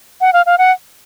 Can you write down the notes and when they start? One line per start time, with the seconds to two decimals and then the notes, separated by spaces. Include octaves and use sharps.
0.21 F#5
0.33 F5
0.46 F5
0.58 F#5